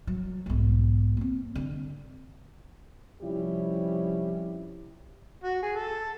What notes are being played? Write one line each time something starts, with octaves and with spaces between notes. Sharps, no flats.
F#3
B1 G#2
A#3 C4
D3
C3 F3 G3 C#4 E4 G4
F#4
G#4
A4